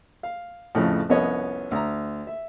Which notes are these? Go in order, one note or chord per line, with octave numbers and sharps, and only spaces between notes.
F5
F2 A2 C#3
C2 F2 B3 C#4 C#5 D#5
D2 A#5
E5